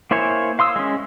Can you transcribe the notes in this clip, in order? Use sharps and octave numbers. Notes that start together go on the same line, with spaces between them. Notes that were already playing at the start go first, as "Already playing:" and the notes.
A#3 E4 C5 C#5 G#5
F5 C6 D#6 E6
G#3 C#4